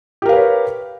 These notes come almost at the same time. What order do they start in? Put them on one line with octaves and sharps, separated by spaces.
G4 A#4 F5 B4 C#5